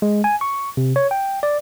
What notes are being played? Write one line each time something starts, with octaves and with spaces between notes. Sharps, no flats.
G#3
G#5
C#6
C3
C#5
G5
D5